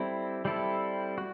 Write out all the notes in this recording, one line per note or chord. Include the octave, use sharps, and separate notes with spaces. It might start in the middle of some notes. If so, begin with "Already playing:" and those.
Already playing: G3 C4 E4 A4
G3 C4 E4 A4
F#4